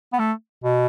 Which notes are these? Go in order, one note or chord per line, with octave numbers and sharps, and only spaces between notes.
B3
A3
B2